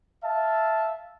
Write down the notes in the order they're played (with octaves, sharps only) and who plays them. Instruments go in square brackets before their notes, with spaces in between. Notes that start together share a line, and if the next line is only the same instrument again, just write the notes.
[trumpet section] E5 F5 A5